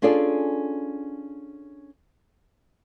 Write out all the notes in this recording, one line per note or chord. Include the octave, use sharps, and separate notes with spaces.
C#4 D4 F4 G#4 A4 D5